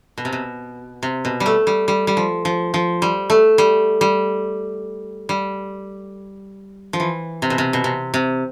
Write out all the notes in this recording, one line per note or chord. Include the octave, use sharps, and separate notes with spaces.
B2
C3
B2
C3
B2
G3
A3
G3
G3
G3
F3
F3
F3
G3
A3
G3
G3
G3
F3
E3
C3
B2
C3
B2
C3
C3